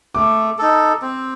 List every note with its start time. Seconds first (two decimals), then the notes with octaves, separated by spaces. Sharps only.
0.15 A3 D6
0.58 D#4 A4
1.02 C4